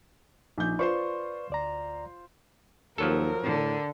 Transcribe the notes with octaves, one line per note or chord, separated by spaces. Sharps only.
A#1 D#4 G6
F4 B4 C5 D5 C6 C#6
D2 D5 A#5
D#2 F3 F#3 A4 A#4
A2 D3